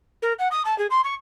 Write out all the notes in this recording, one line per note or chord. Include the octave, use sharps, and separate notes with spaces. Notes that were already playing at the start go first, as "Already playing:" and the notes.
A#4
F#5
D#6
A5
G#4
C6
C#6